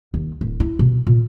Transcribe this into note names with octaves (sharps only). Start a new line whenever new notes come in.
D#2
D1
E4
B2
A#2